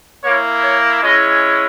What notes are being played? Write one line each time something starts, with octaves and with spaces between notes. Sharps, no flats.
A#3 E4 C#5
C#5
G#3 C#4 E4 D#5